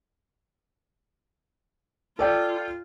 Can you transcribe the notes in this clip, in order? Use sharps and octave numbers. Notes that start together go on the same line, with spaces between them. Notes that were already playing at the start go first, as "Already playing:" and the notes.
F4 A4 D5 G5